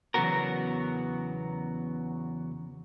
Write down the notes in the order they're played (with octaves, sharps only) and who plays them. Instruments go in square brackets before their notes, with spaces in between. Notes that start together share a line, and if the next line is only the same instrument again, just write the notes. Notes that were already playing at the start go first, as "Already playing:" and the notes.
[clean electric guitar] E2 C#3 F#3 B3 F#4 A#4